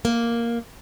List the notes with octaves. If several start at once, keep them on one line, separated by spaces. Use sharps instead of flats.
A#3